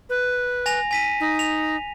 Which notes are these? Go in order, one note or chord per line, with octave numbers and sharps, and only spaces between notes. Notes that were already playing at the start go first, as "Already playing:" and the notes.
B4
G#5 A#6 F7
G#5 B6 D#7
D#4
F7